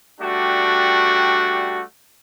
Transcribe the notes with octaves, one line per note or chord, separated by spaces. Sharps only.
G3 A3 D4 F#4 G4 F#5